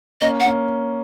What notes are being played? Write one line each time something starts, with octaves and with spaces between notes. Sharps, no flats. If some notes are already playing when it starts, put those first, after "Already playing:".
A#3 C#4 D#5
F#5
A#3 C#4